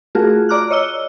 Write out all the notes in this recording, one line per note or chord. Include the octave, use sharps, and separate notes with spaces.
A3 F4 F#4 G#4 A#4
D5 A#5 D6 F6 F#6
C#5 D#5 E6 G7